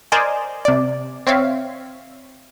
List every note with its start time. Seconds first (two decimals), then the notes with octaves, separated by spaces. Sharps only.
0.12 A#4 C5 D5 D#5 G#5
0.65 C3 D5
1.27 C4 C#5 E5 F5